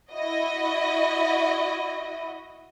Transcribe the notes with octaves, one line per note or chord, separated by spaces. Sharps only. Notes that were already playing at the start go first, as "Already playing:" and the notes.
E4 F#4 D#5